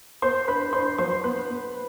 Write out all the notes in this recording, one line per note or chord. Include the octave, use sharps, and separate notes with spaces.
B3 C5 C6
D4 B4 B5
D4 C5 C6
F#3 C5 C6
B3 B4 B5
B3